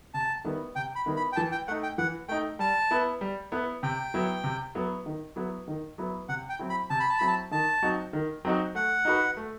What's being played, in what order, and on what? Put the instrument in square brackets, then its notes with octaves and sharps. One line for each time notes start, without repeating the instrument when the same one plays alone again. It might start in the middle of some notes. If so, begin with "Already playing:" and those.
[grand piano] C3 [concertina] A5
[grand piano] D#3 G3 B3 E4
[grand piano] C3 [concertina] G5
[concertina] B5
[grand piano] D#3 G3 B3 E4
[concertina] B5
G5
[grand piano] E3 [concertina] A5
[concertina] G5
[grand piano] A3 D#4 [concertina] F#5
[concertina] G5
[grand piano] E3 [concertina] F#5
[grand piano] A3 D#4 [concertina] G5
[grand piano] G3 [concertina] A5
[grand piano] B3 E4 B4
G3
B3 E4 B4
[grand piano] C3 [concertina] G5
[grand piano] F#3 B3 E4
C3
F#3 B3 E4
D#3
F#3 B3 E4
D#3
F#3 B3 E4
[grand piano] C3 [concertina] F#5
[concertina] G5
[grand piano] F#3 C4 E4
[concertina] B5
[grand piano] C3 [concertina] A5
[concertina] B5
A5
[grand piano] F#3 C4 E4 [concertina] B5
[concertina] A5
[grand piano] D#3 [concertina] A5
[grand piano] F#3 C4 D#4 F#4
D#3
F#3 C4 D#4 F#4
[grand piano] A3 [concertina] F#5
[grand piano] D#4 F#4 B4
A3